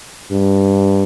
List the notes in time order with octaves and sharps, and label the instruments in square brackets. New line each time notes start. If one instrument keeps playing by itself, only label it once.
[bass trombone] G2